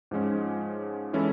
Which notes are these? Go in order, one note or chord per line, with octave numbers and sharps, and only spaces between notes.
G#2 F3 G#3 C#4
E3 G#3 C#4 E4 A4